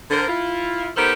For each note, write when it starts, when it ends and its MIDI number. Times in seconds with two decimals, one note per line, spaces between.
0.10 0.27 50
0.10 0.27 70
0.10 0.27 72
0.27 0.88 64
0.27 0.88 65
0.96 1.13 59
0.96 1.13 63
0.96 1.13 67
0.96 1.13 69
0.96 1.13 70
0.96 1.13 72